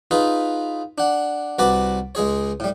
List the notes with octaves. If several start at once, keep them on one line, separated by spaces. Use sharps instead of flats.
D#4 F4 G#4 B4
D4 F#5
C2 F#4 B4 A5 D6
C#2 G#3 G#4 C#5
A2 G3